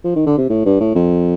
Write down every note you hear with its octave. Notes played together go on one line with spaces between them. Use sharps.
F3
D#3
D3
C3
A2
G2
A2
F2